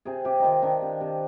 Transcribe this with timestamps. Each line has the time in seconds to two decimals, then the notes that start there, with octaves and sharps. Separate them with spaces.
0.05 C3 G#4
0.25 C3 G4
0.40 D#3 D#4 F4
0.62 D#3 D4
0.82 C3
1.01 C3